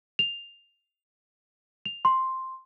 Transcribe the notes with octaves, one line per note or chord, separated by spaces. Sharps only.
F7
F7
C6